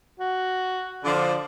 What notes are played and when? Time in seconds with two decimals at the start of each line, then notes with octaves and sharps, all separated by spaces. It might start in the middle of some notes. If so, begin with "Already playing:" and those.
0.20 F#4
1.05 D3 F3 D5